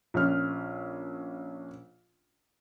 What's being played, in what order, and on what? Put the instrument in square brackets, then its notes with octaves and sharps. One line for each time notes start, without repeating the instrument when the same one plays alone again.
[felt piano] A#1 C#4 F6